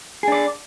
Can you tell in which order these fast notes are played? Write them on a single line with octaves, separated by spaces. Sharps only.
G#4 D4 D5